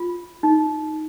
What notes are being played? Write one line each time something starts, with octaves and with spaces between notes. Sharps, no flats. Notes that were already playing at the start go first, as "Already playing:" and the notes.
Already playing: F4
D#4